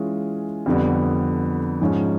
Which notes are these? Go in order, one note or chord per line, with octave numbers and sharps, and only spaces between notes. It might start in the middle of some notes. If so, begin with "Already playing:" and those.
Already playing: E3 G#3 C#4 F4 G#4
F2 D3 G3 B3
G#2 F3 G#3 C#4